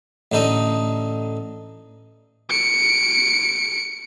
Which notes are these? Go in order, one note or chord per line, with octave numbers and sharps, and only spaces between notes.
A1 D3 D#4 A4 D#5
C#7 D7